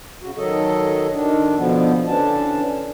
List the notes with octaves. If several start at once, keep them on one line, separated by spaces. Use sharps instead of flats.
C#3 F#4
D#3 F#3 A4 D#5
D#3 D4
B2 D3 F3 B3
D3 E3 C#4 D4 A5